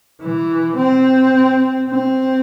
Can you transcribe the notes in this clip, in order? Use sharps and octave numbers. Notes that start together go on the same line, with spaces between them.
E3
C4
C4